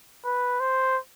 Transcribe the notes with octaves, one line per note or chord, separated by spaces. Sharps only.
B4
C5